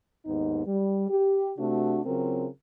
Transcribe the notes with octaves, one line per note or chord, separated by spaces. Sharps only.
D#2 G#2 B3 D#4
G3
G4
C3 A3 D4 F#4
C#3 F#3 C4 F4 A#4